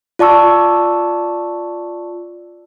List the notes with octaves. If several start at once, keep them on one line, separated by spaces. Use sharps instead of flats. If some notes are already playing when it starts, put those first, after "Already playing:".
F4 D5 A5 C#6 E6